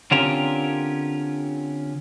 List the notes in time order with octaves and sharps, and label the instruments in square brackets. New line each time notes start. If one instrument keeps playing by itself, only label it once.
[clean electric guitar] D3 C4 C#4 F4 G4 A#4